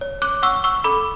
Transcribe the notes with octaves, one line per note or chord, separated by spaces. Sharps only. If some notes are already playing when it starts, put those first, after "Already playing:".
C#5
D6 F#6
F#5 C#6 E6
C#6 E6
A4 B5 D6